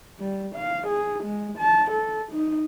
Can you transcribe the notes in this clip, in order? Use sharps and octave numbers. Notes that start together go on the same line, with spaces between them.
G3
F5
G#4
G#3
A5
A4
D#4